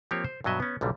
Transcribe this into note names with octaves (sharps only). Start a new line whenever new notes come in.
F3 A#3 C4 G4 C#5
C5
G2 B2 F#3 D#5 E5
B3 C#4
B1 A#2 D3 G3